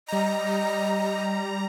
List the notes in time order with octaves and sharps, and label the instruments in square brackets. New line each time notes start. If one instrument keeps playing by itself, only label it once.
[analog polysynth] G3 A#5 [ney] D#5